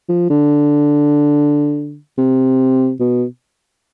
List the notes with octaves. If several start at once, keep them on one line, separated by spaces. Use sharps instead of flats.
F3
D3
C3
B2